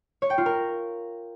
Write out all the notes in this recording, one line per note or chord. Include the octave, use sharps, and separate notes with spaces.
C#5
G5
F4
A#4